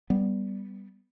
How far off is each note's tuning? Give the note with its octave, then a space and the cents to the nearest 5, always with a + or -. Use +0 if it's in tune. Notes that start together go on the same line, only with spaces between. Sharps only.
G3 +0 B3 +0